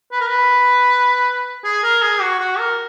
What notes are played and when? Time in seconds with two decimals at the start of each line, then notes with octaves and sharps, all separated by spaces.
0.12 B4
0.21 A#4
0.28 B4
1.64 G#4
1.83 A#4
2.02 G#4
2.21 F#4
2.40 F#4
2.59 A#4